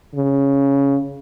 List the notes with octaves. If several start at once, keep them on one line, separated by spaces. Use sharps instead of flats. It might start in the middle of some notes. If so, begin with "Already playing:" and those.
C#3